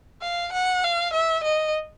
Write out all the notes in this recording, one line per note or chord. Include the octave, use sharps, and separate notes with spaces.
F5
F#5
F5
E5
D#5